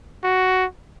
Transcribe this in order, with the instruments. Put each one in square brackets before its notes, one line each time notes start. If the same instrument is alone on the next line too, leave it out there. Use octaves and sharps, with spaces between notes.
[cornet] F#4